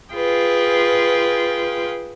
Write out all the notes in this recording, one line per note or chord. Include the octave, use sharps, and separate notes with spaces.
F4 G#4 B4 G5